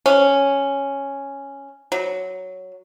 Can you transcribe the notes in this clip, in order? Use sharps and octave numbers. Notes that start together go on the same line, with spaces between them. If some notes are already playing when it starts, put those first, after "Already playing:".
C#4
F#3